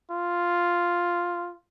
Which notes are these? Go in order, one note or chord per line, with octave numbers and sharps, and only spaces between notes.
F4